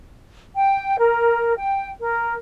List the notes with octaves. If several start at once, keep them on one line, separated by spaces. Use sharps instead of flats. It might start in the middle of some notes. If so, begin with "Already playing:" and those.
G5
A#4
G5
A#4